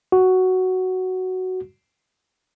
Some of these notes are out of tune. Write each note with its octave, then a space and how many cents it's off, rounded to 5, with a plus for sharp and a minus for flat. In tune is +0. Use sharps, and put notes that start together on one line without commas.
F#4 +5